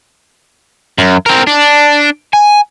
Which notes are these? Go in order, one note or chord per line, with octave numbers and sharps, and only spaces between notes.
F#2
C4 A#4
D4
G#5